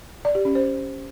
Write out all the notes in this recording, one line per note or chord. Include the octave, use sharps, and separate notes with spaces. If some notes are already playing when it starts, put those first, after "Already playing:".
D5
G4
C#4
C5